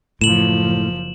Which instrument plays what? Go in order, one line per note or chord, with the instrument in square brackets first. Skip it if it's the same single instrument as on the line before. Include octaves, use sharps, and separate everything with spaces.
[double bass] F#1 F3 [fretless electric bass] A2 [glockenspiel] E7 F#7